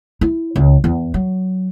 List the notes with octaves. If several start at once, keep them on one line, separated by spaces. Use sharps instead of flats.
E4
C#2
E2
F#3